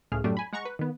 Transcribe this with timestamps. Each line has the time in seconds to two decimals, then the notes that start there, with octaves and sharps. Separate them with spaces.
0.12 C#2 A2 G#4 F6
0.24 F#2 A2 F#3 G3 A3 D4
0.37 G#5 B5
0.53 G#3 F#5 A#5 C#6
0.65 B4
0.79 D#3 B3